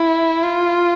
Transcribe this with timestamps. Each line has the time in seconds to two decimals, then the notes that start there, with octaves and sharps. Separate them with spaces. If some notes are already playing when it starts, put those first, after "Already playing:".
Already playing: E4
0.43 F4